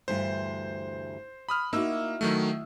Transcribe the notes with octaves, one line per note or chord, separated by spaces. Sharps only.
D2 G2 E3 C5
B5 D#6 F6
A#3 D#4 E4 F#4 E6
D#3 F#3 A3